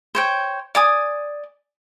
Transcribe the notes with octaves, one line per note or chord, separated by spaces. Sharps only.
C5 C#5 G5
D5 G#5 D#6